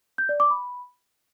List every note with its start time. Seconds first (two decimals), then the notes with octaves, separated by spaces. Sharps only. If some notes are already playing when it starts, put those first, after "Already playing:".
0.18 G6
0.29 D5
0.40 D6
0.51 B5